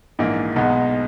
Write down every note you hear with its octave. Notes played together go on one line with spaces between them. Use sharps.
A#1 G#2 E3 A#3 D#4
B1 B2 G#3 B3 D#4